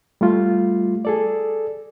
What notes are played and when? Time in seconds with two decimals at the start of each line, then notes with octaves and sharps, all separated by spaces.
0.21 G3 A3 F4
1.05 G#4 A4 D5